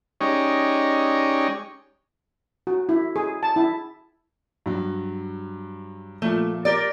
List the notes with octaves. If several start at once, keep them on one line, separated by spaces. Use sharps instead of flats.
G#3 C#4 D#4 G4 C#5 D5
F#4
E4
G#4
A5
E4
G2 F#3
A#2 F3 A3
G4 A#4 D5